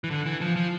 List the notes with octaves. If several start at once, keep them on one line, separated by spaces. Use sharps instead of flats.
E3
D3
E3
F3
F3